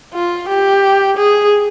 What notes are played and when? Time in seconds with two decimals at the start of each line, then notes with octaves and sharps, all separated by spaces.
0.14 F4
0.49 G4
1.17 G#4